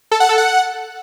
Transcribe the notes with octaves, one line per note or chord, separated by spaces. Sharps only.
A4
F#5
A4
F#5